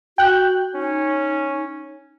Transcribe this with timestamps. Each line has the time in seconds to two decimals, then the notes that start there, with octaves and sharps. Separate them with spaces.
0.18 F#4 G5 F#6 G6
0.75 C#4 D#4